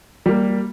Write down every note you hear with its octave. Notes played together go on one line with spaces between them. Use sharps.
G3 A#3